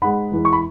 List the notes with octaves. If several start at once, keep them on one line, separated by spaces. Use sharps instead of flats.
G#2 G#3 F#5 B5
E2 E3 G#3
C#6
B5